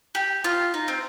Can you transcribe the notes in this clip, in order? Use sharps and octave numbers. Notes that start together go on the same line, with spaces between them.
G4
F4
D#4
C4